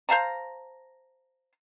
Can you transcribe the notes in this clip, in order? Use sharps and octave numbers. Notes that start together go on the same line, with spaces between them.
C5 F5 A5 A#5